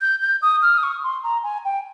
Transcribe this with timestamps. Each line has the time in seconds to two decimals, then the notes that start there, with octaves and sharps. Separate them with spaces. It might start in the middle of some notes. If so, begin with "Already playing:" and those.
0.01 G6
0.22 G6
0.42 D#6
0.62 F6
0.78 D#6
0.83 C#6
1.03 C6
1.23 A#5
1.44 G#5
1.65 G5